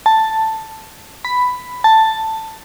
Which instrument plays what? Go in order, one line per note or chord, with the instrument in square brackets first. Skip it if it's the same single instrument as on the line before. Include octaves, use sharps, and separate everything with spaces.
[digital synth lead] A5
B5
A5